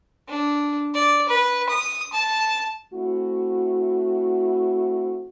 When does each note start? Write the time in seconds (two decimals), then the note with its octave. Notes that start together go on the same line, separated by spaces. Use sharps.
0.29 D4
0.95 D5
1.29 B4
1.69 D#6
2.12 A5
2.94 A3 C4 E4 F#4